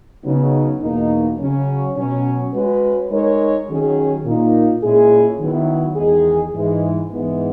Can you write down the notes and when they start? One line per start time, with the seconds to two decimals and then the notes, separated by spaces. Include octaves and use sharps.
0.24 C#3 F#3 B3 D#4
0.81 E2 B2 A#3 D#4
1.39 C#3 F#3 C#4
1.96 B2 F#3 C#4
2.53 G#3 C#4 F#4 B4
3.10 G#3 D#4 A#4 C#5
3.68 D#3 F#3 C#4 G#4
4.25 A#2 A#3 D#4
4.82 A#2 G#3 C#4 E4 G#4
5.39 D#3 F#3 B3 E4
5.97 E2 D#3 G#3 D#4 G#4
6.54 G#2 E3 G#3
7.11 G#2 E3 G#3 B3